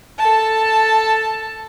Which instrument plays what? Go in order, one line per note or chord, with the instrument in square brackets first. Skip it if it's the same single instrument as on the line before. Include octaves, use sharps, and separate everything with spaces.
[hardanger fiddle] A4 A5